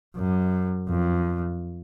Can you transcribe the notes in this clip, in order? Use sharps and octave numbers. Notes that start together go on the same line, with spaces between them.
F#2
F2